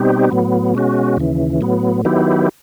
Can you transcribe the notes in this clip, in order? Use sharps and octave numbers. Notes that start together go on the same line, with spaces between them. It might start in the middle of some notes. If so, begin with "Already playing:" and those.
Already playing: B2 G3 C4 D#4 G4
A2 F#3 B3
B2 G#3 C#4 F#4
D#2 C#3 E3
A2 F#3 B3
D#3 F#3 B3 E4 G4